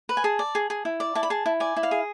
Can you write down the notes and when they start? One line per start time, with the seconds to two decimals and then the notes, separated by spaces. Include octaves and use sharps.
0.09 B4
0.17 G#5
0.24 G#4 A5
0.39 D5
0.55 G#4
0.70 G#4
0.85 E4
1.00 D5
1.15 E4 A5
1.23 B5
1.30 G#4 A5
1.46 E4
1.60 D5 G#5
1.77 E4
1.83 F5
1.91 G#4